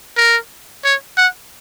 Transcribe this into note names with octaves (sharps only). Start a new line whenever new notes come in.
A#4
C#5
F#5